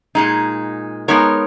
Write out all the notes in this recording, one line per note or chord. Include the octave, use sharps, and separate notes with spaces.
A#2 G#3 D#4
G#3 B3 D#4 A#4 C#5